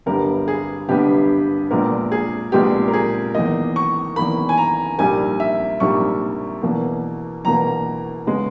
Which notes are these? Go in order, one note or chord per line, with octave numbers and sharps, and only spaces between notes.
G1 G2 G3 B3 A#4
G#4
G1 G2 G3 B3 G4
A#1 A#2 G#3 B3 A#4
G#4
A#1 A#2 G#3 B3 G4
A#4
G#4
E2 D#3 A#3 D#5
C#6
E2 D#3 A#3 B5
G#5
A#5
A#1 G#2 G3 A#3 G#5
E5
A#1 G#2 G3 A#3 C#6
E2 B2 A#3
E2 B2 A#3 A#5
C#3 G#3 B3